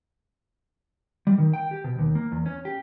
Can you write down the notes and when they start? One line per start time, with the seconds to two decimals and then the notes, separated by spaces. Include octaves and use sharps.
1.27 G3
1.38 D#3
1.53 G5
1.71 G4
1.84 B2
1.98 D#2
2.15 A#3
2.32 E2
2.46 C#4
2.65 G4